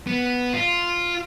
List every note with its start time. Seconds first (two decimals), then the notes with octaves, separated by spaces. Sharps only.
0.07 B3
0.53 F4